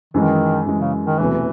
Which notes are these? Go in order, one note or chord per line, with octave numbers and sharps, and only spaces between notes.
F#2 D#3 E3 G#3
F#2 E3 G#3
C#3
D#3
E1 E2 C3 E3 F#3 A3